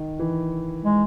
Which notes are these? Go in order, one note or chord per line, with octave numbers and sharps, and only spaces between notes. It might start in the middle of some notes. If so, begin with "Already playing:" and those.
Already playing: D#3
E3
G#3